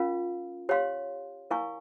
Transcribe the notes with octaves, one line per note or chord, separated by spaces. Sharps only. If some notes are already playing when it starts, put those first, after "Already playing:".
Already playing: C#4 F4 A#4 F5
G4 C#5 F5 C6
E4 A#4 F5 G#5 C#6